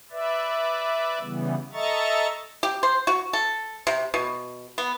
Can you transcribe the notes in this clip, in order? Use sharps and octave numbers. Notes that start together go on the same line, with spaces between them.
B4 D5 E5
C#3 E3 G3 B3
A4 D#5 E5 A#5 C#6 A6
G4
C5
F#4
A4
C3
B2
B3